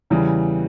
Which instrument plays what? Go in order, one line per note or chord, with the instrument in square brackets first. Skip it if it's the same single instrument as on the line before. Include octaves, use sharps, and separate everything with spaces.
[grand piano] E2 C#3 E3 G3